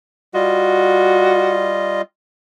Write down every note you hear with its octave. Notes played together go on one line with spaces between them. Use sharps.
G3 F4 F#4 D#5